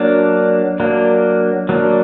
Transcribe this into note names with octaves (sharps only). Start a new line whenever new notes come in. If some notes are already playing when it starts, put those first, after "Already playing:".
Already playing: F#3 A#3 D4
F#3 A#3 D4
F#3 A#3 D4